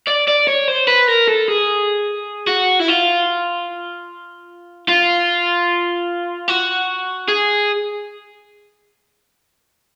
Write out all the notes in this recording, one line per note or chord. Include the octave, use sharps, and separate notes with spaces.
D5
D5
C#5
C5
B4
A#4
A4
G#4
F#4
E4
F4
F4
F#4
G#4